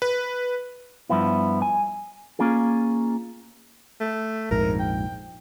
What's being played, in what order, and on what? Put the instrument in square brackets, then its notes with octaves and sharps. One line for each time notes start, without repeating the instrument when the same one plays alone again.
[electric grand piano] B4
[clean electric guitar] G2 F3 B3 E4
G#5
A#3 C#4 F4 G#4
[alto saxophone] A3
[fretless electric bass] A#1 F2 G#2 [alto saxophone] A#4
[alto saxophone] G5